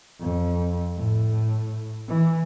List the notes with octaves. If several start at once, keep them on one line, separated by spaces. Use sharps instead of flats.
F2
A2
E3